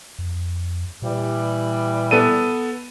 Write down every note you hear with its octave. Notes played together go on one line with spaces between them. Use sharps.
F2
A#2 E3 G3
B3 A4 D#7